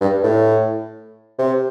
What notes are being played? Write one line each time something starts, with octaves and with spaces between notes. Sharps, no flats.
G2
A2
C3